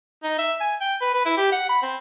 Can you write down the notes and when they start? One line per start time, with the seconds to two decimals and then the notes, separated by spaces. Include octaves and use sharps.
0.24 D#4
0.38 E5
0.61 G#5
0.81 G5
1.01 B4
1.14 B4
1.25 E4
1.37 G4
1.52 F#5
1.69 B5
1.82 C4